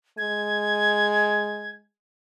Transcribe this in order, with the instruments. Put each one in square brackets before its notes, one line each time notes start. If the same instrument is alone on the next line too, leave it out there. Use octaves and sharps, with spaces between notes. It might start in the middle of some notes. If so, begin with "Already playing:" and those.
[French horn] G#3 [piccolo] G#6